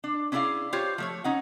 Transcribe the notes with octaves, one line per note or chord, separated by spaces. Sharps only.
D4
C#4 D4 E4 G#4 D5 F5
F4 G4 C5 C#5
F3 A3 C#5
C#4 D#4 F#5